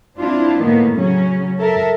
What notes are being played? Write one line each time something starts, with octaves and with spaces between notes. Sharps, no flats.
C4 D4 E4 F4
A2 D#3 A#3 B3
C#3 F#3 C#4
A4 A#4 E5